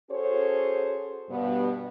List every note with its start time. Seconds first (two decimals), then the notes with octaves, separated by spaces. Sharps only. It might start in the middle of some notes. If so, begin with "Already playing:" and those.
0.10 C#4 F#4 G#4 A4 C5 C#5
1.29 G2 B2 B3